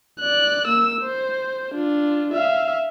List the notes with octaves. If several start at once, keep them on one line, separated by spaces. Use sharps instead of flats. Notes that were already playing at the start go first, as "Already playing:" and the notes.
D5 F#6
A#3 E6
C5
D4 F4
E5 F5